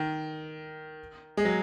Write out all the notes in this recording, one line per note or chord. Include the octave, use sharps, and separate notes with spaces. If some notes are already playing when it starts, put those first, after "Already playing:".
Already playing: D#3
G#3
F#3